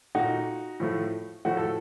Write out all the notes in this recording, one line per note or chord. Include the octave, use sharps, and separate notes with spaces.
A#2 A3 D#4 F#4
A2 F3 A3
A2 F3 A3 F#4
A4